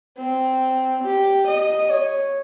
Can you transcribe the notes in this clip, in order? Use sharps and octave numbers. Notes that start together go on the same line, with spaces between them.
C4
G4
D#5
C#5